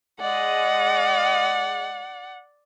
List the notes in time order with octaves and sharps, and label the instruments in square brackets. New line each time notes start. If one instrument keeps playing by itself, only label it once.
[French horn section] G#3 D#5 [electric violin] D5 [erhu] F#5